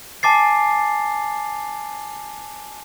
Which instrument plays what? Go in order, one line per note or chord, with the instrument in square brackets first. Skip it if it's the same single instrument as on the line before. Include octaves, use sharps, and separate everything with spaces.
[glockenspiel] G#5 A5 D6 A6 C7